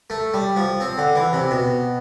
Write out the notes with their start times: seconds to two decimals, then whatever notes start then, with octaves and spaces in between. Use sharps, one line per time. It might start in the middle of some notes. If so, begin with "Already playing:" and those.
0.10 A3
0.34 G3
0.57 F3
0.80 C4
0.98 D3
1.16 E3
1.33 C3
1.51 B2